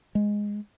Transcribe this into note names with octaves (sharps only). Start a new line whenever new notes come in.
G#3